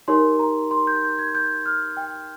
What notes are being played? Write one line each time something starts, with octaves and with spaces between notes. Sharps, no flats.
D#4 G4 A#4 C#5 C6
A#5
C6
G6
G6
G#6
G6
F6
G5